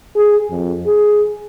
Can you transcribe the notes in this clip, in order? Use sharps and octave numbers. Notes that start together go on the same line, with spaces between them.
G#4
F2
G#4